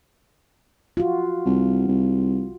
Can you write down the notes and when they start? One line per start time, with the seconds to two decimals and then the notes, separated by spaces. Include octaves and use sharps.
0.97 F4 F#4
1.46 C2
1.88 C2